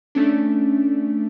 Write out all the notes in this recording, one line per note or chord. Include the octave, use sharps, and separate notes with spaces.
A3 C#4 D4